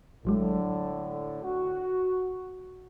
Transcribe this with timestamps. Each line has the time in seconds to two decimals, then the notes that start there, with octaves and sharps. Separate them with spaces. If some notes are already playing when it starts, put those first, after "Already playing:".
0.25 A1 A2 D3 F#3 G#3
1.43 F#4